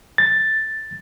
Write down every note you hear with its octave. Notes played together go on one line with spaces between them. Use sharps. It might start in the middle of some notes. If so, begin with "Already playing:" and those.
A6